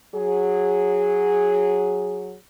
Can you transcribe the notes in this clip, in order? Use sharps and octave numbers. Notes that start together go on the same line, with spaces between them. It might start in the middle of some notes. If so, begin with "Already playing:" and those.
F#3 G#4